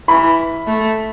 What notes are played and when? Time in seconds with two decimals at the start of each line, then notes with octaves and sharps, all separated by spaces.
0.08 E3 B5
0.67 A3